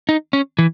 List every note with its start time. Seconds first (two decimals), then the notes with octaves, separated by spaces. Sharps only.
0.09 D#4
0.33 C#4
0.59 E3